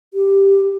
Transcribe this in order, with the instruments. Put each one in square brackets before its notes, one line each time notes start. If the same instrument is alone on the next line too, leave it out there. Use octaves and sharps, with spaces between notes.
[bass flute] G4